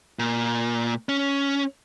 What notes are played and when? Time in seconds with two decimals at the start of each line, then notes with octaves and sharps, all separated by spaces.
0.19 A#2
1.09 C#4